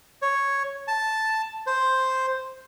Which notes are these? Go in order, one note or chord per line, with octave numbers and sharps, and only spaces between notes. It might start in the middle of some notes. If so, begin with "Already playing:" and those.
C#5
A5
C5